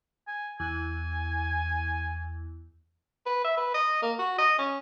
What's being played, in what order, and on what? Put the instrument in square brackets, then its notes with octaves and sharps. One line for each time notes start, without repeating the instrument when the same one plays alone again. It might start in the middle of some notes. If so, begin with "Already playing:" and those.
[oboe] G#5
[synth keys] E2 [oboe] G#5
[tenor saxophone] B4
E5
B4
D#5
A#3
F#4
D#5
C#4